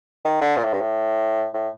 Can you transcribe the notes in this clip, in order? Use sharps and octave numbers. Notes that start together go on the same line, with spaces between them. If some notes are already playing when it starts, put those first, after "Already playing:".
D#3
D3
A#2
A2
G2
A2
A2